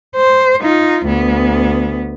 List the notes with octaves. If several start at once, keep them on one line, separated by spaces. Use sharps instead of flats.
C5
D#4 F4
D2 B3